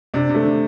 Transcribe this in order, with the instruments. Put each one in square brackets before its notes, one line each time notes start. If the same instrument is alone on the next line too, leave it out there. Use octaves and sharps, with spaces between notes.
[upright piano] C3 [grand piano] D4
[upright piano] C3
[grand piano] A3
[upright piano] D3